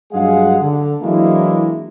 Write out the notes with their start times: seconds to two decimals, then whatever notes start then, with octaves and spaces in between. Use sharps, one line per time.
0.12 G2 F#3 G#3 G#4 F5 F#5
0.60 D3
1.02 E3 F#3 G#3 A#3 D4 E4